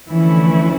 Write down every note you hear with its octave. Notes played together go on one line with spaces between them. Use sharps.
D2 D3 E3 F3 A3 C#4 E4